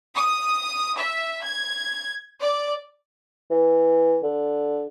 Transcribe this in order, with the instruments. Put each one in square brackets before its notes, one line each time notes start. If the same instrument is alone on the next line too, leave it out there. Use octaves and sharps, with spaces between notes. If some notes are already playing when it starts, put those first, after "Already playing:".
[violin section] D#6
E5
G#6
D5
[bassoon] E3
D3